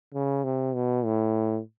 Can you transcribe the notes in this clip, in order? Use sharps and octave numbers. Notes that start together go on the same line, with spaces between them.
C#3
C3
B2
A2